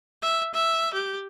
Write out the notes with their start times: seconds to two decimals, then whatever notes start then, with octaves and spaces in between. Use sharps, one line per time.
0.22 E5
0.54 E5
0.93 G4